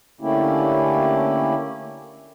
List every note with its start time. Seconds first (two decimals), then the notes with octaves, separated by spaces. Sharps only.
0.21 D3 A3 A#3 C#4 E4 G4